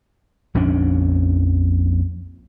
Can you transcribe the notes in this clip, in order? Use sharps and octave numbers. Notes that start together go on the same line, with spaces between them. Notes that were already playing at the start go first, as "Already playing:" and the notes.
A#1 F2 C#4 D4